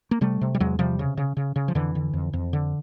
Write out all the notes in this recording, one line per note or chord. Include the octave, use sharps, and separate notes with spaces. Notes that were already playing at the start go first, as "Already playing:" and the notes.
A#3
C3 G3 A3
C3
G3
E2 F#3 G#3
C3 F3 G3
C#3
C#3
C#3
C#3
F3
F2 D3 E3
D3
F2
F2
D3